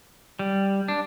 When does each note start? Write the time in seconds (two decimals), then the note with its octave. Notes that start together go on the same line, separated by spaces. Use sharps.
0.39 G3
0.88 D4